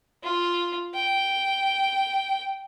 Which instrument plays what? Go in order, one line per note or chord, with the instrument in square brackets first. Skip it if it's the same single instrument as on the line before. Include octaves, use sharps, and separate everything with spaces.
[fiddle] F4
G5